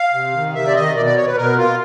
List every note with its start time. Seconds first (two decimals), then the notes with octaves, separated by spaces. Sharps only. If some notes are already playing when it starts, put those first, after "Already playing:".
Already playing: F5
0.13 C3
0.34 D#3
0.54 C3 E5
0.67 D5
0.75 D#3 D#5
0.95 B2 D5
1.06 D5
1.16 C#5
1.27 B4
1.37 B2 A#4
1.57 F4